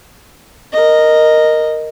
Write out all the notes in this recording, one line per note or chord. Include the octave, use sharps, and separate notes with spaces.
A#4 D#5